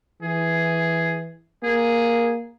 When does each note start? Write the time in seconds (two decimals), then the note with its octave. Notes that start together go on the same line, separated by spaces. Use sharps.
0.22 E3 G#4
1.63 A#3 G#4